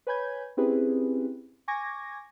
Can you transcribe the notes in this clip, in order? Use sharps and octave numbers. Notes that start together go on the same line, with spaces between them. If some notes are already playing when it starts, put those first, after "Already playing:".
B4 C#5 G#5 B5 G6 G#6
C4 C#4 E4 G4 G#4 B4
G#5 C#6 D6 G#6 A#6